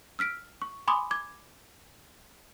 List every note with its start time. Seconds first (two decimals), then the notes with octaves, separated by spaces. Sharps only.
0.19 E6 F6 B6 D7
0.62 C#6
0.88 G#5 B5 C6 D6 D#6
1.11 D6 G#6